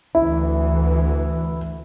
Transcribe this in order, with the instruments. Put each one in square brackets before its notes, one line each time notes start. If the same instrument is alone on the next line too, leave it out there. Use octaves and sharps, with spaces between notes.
[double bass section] D2 E3 [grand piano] E4